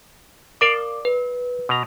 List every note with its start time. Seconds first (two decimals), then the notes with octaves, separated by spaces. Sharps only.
0.61 A#4 D5 F5 D6
1.05 B4
1.69 B2 A#5